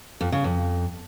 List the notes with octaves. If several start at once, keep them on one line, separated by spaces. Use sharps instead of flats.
F2
C#3
F2